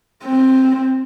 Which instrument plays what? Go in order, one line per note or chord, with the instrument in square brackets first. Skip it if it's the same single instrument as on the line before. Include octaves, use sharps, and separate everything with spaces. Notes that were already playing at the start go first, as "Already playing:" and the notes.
[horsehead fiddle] C4